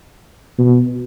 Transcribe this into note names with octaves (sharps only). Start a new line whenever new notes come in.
B2